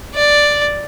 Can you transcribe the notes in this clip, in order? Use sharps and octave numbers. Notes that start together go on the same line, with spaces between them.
D5